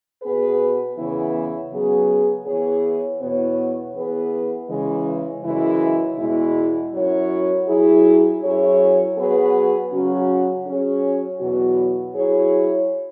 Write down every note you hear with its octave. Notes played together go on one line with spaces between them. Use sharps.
B2 B3 G#4 B4
E2 C#3 E3 B3 E4
C#3 F#3 B3 G#4
E3 B3 G#4 C#5
E2 B2 B3 E4 C#5
E3 B3 G#4 B4
C#3 E3 G#3
F#2 C#3 E3 G#3 E4
E2 B2 G#3 E4
F#2 F#3 E4 C#5
F#3 E4 G#4
F#2 F#3 E4 G#4 C#5
F#3 B3 G#4 B4
C#3 F#3 C#4 F#4
F#3 C#4 G#4 C#5
E2 B2 F#3 B3 F#4
F#3 E4 G#4 C#5